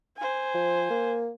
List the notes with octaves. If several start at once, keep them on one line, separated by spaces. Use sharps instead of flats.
C5 G#5
F3
A#3